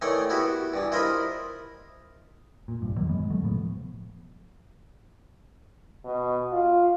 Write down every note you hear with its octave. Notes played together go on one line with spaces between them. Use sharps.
D#3 E3 A3 C#5 D5 C6
B3 E4 F#4 G4
G2 E3
E4 F4 A#4 C5 D#5 B5
A#2
G1 C2 G2
F2 D#3 F#3 A#3
D1 F#3 G#3 B3
D2 F#3 A3
A2 C3 F3 B3
B2
F4